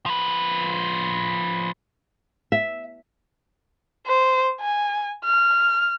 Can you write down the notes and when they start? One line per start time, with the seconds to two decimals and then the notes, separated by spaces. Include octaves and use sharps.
0.06 F3 B4
2.52 E5
4.07 C5
4.60 G#5
5.25 F6